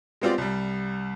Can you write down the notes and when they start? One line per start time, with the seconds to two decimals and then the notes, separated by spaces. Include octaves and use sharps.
0.21 G#3 B3 C4 F4 G4 D5
0.38 C2 G3